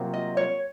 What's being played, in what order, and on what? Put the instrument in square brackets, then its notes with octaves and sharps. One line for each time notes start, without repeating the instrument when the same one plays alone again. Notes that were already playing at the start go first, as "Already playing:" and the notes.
Already playing: [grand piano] C3 F#3 A#3 F4 C5
[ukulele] D#5
C#5